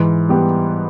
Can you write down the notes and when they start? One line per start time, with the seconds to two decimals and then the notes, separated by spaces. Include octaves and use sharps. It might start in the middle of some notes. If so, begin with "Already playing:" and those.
Already playing: G#2 E3
0.29 G3 B3 G4